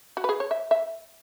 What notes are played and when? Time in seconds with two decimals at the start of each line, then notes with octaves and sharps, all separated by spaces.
0.17 F#4
0.24 B4
0.29 G#4
0.40 C#5
0.51 E5
0.71 E5